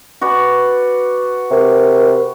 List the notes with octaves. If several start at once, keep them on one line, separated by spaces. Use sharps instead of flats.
F#4 B4 D5
C3 A#4